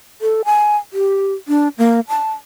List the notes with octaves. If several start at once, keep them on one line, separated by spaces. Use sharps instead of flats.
A4
G#5
G4
D4
A#3
A5